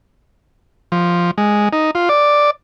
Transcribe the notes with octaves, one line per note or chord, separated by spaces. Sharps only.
F3
G#3
D#4
F4
D5